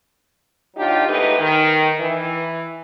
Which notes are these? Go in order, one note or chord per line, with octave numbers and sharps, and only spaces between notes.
D#2 F#3 D4 D#4 F4 G4
E2 G#2 A3 D#4 G4 B4
D#3
E3